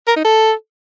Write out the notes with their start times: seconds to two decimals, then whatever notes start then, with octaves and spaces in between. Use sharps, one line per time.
0.08 A#4
0.16 D#4
0.25 A4